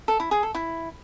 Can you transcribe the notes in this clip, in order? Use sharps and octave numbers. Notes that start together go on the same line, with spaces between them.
A4
E4
G#4
A4
E4